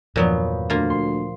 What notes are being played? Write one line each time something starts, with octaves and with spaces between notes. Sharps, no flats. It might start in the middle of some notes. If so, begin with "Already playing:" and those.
E2 G2 A#2 D#3 F3 F#3 B3
D2 A#3 F4
C6